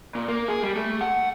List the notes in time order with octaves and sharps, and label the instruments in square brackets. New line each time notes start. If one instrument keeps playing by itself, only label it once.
[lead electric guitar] A#2
A#3
G#4
G3
A3
F#5